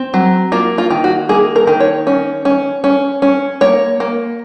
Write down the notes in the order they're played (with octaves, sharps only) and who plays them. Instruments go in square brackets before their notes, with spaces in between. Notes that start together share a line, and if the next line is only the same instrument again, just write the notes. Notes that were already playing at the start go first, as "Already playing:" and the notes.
Already playing: [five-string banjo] C4
F#3
A#3 F4
F4
D#3
F#4
A#3 G#4
A#4
D#3
C#5
C#4
C#4
C#4
C#4
A#3 C#5
A#3